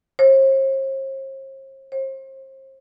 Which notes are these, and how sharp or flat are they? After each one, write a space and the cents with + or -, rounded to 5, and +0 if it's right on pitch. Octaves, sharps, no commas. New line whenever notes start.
C5 +45
C5 +35